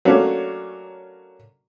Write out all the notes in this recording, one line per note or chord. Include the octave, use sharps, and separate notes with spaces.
F#3 A3 A#3 C#4 D4